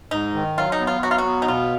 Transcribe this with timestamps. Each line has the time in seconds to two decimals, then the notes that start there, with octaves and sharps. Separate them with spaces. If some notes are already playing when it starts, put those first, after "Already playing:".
0.11 G#2 D#4
0.34 D#3
0.57 F#3 F4
0.72 D#4
0.80 B3
0.87 F4
1.03 F#3 F#4
1.11 F4
1.18 F#4
1.25 B3
1.42 D#4
1.48 B2 F4